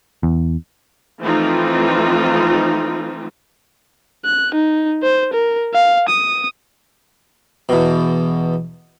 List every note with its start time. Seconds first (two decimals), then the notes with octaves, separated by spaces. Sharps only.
0.23 E2
1.20 E3 F3 A3 C4 D#4 F4
4.25 F#6
4.55 D#4
5.03 C5
5.33 A#4
5.74 F5
6.09 D#6
7.69 E2 B2